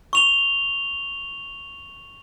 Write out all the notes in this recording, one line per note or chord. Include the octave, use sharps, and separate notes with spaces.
C#6 F7 G7